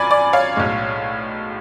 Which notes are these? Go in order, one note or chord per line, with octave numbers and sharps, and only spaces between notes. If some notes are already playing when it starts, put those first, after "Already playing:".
Already playing: G#1 F#2 D5 G#5 B5
D5
C#5 F5
B1 A2 G#3